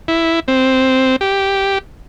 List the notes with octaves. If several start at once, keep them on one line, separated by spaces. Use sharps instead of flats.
E4
C4
G4